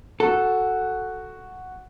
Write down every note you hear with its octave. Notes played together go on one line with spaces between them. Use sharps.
F#4 A4